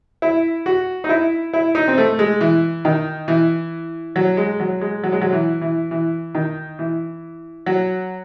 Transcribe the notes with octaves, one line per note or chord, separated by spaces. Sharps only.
E4
F#4
D#4
E4
E4
D#4
C4
A3
G#3
E3
D#3
E3
F#3
G#3
F#3
G#3
F#3
G#3
F#3
E3
E3
E3
D#3
E3
F#3